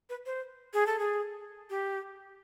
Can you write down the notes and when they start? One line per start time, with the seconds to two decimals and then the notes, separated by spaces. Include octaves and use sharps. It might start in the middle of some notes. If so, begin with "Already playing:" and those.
0.09 B4
0.26 C5
0.73 G#4
0.86 A4
0.99 G#4
1.70 G4